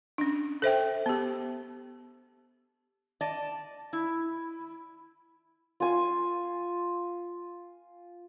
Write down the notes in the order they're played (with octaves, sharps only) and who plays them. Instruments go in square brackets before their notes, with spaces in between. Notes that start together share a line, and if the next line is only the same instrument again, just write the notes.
[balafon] C#4 D4
A4 C5 E5 G5
B3 G4
[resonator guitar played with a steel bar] D5 D#5 A5
E4
[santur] F4 G#5